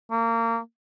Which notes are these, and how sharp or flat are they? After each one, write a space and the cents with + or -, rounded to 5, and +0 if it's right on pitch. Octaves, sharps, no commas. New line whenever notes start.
A#3 -25